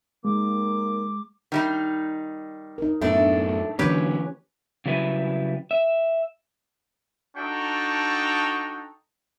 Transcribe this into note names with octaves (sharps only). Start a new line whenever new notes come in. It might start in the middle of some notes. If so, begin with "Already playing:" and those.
D#2 D#3 G#3 A#3 D6
D#3 G3 D#4
D#4 A#4
F#2 A2 A3 B3 D4
D3 E3 F#3 A#3 C#4 G4 B4 C#5
C#3 F#3 G3 E4 B4
E5
D4 D#4 F#4 A4 G5 C#6